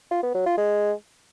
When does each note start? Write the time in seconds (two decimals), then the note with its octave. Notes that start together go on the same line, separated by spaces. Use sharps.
0.11 F4
0.23 B3
0.35 F#3
0.46 F4
0.58 G#3